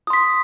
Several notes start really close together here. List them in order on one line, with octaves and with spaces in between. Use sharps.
D#6 C6 B6